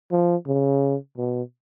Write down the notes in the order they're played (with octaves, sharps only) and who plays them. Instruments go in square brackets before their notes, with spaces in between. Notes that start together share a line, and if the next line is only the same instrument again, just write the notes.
[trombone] F3
C#3
B2